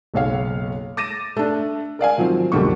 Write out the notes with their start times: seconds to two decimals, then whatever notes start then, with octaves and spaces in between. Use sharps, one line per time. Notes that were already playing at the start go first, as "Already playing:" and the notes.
0.14 F#1 B1 C#5 F5
0.97 D6 A6 A#6 D#7 E7
1.37 A3 D4
1.99 A#4 D5 F5 G#5
2.18 D#3 F3 F#3 C4
2.52 B1 F2 D3 G3 A#3 C#6